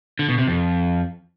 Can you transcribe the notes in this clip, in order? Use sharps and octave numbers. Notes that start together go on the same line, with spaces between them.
D3
B2
C3
F2